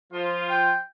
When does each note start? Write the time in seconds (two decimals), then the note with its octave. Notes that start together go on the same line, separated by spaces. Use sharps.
0.13 F3 F4
0.49 G5